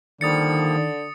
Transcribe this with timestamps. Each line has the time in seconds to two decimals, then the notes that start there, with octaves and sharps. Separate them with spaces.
0.21 D3 D#3 F3 G3 A#3 D#6 A6 C#7